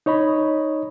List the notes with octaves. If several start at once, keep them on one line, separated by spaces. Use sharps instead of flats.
D#4 C#5 D#5 B5